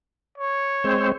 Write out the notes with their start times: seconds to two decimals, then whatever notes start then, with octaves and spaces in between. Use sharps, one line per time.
0.38 C#5
0.84 G#3 C4 C5